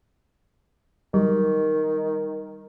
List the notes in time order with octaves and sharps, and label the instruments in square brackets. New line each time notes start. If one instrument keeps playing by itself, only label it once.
[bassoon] D#3 [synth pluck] F#3 G3